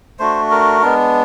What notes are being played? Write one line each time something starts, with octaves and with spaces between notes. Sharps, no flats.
A3 D4 F#4 C5
A#4
G#3 B3 D4